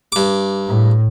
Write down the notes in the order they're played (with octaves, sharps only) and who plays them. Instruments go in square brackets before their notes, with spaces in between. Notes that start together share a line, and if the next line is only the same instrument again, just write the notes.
[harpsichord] G2 D6
[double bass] A2